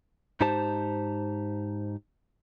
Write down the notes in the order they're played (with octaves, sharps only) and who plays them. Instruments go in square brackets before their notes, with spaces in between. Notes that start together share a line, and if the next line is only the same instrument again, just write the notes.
[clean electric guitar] G#2 D#4 G4 C5 A5